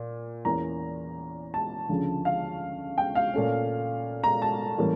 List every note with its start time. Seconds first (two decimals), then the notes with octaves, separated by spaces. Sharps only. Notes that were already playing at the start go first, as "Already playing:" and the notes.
Already playing: A#2
0.45 E2 E3 A#3 C#4 A#5
1.54 A5
1.89 D2 C#3 F3
2.25 F5
2.98 G5
3.15 F5
3.33 A#2 A3 C#4
4.24 A#5
4.42 A5
4.78 A2 E3 G3 A#3 C#4